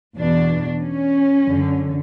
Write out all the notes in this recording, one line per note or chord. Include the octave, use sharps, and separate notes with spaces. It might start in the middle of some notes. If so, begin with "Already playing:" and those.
E2 B2 D4
C#4
F#2 D3